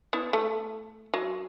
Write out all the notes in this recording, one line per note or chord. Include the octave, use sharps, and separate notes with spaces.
B3 E4
A3
F#3